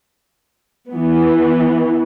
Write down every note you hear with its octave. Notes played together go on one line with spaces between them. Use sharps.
E3 B3